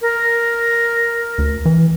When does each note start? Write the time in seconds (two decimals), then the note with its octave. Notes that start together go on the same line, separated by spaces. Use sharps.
0.02 A#4
1.38 D2
1.65 E3